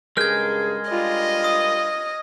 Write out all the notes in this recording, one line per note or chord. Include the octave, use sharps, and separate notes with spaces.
G2 C#3 G#3 G#4 A#4 F6 G6 G#6
G3 D4 F4 D#5
D#6